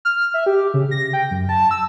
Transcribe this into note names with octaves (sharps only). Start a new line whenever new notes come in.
F6
E5
G4
C#3
A#6
G5
F#2
A5
E6